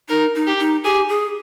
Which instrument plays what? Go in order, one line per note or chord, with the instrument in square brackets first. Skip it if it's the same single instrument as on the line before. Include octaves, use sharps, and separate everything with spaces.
[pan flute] D#4 [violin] A#4
[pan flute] D#4
[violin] G4
[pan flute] D#4
[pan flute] G4 [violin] G#4
[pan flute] G#4